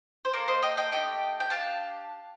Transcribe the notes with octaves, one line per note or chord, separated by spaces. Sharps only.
C5
A#3 F4 A4 A#4 D5
C5 D#5
D#5 G5
D#5 G5
A3 D4 G4 D#5 G5
G5
D4 G4 F5 A5